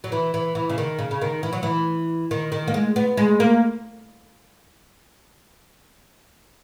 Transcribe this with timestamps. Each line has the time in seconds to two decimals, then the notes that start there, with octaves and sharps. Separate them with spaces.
0.04 F#3
0.12 E3
0.34 E3
0.55 E3
0.69 C#3
0.78 D#3
0.98 C#3
1.11 C#3
1.21 D#3
1.43 E3
1.53 F#3
1.63 E3
2.31 D#3
2.52 D#3
2.68 A#3
2.74 G#3
2.96 B3
3.17 G#3
3.40 A#3